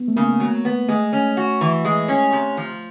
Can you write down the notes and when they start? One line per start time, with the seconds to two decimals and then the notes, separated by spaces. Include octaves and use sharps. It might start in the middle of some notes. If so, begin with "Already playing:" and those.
Already playing: B3
0.08 A3
0.16 C#3 A#3
0.40 F#3
0.65 B3
0.88 G#3 A3
1.13 C#4
1.37 F#4
1.61 E3
1.85 G#3
2.08 C#4
2.33 C3
2.57 F3